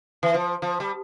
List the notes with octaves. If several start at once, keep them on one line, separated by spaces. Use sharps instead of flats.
E3
F3
F3
G3